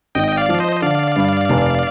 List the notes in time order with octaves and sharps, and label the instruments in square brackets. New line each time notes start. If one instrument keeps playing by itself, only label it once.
[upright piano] G#1 [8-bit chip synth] D#5 G5
[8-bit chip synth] G5
D5 F5
[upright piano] F3
[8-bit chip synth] C5 D#5
[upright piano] D3 [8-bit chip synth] D5 F5
[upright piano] G2
F1